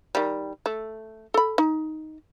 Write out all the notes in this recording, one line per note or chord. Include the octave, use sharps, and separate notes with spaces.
D#3 G3
A3
A4 B5
D#4